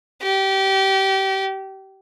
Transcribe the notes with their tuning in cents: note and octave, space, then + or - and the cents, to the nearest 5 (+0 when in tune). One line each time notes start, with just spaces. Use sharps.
G4 -25